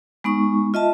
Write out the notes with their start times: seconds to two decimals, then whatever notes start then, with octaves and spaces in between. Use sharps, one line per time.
0.24 G#3 B3 D#4 C#6
0.74 F4 D#5 E5 A5